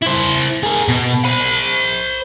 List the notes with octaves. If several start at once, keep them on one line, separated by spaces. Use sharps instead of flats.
E4 C5
G#4 A#4
B2
C5 B5